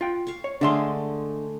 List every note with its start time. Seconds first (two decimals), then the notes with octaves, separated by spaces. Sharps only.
0.01 F4 G5
0.27 F5 C#6
0.44 C#5
0.61 D3 G#3 A3 D4 E5 C6